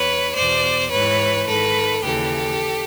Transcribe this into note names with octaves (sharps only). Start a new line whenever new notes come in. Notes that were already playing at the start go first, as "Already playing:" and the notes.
Already playing: E2 B4 C#5
E2 B2 C5 D5
G#2 E3 B4 C#5
G#2 D#3 A4 B4
D#2 C#3 E3 G4 A4